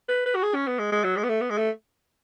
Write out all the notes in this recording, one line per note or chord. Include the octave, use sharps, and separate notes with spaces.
B4
B4
F#4
G#4
C#4
B3
G#3
G#3
F#3
G#3
B3
A3
B3
G#3
A3